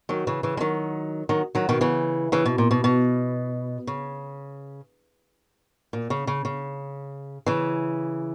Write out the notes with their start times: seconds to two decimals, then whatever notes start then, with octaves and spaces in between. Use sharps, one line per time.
0.09 D#3 F#3
0.27 C#3 E3
0.43 C#3 E3
0.57 G#3
0.60 D#3 F#3
1.29 D#3 F#3
1.55 D#3 F#3
1.69 B2 D#3
1.81 C#3 E3
2.32 C#3 E3
2.46 B2
2.58 A#2
2.71 B2
2.84 B2
3.87 C#3
5.93 A#2
6.10 C#3
6.27 C#3
6.45 C#3
7.46 C#3 E3